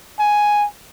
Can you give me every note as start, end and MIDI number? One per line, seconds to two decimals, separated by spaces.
0.19 0.66 80